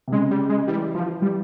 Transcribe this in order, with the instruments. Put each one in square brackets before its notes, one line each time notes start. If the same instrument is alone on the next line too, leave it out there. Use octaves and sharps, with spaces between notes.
[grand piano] C3
[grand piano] C#3 [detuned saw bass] G#3
[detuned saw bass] G3
G#3
[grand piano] E3 [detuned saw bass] G3
[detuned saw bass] F3
G3